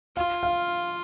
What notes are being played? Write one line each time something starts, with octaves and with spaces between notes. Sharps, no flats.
F4 F5
F5